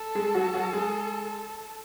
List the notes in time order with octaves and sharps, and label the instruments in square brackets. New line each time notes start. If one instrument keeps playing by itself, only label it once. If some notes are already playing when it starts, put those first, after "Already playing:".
Already playing: [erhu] A4
[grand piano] G#3 G#4
F#3 F#4
F#3 F#4
G#3 G#4